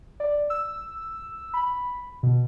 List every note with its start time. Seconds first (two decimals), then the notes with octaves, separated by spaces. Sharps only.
0.20 D5
0.50 E6
1.54 B5
2.23 B2